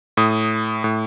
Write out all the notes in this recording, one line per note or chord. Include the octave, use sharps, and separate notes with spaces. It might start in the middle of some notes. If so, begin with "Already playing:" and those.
A2 D#6
A2